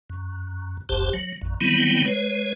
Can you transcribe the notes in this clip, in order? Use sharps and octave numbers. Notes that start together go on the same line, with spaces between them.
F#2
F#1 C2 F#2 G4 C5 A5
F#3
A#1 F#2
D#3 F#3 G3 B3 C4 E4
G#3 B4 C#5